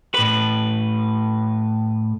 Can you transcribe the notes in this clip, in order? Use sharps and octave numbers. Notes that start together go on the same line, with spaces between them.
A2 B4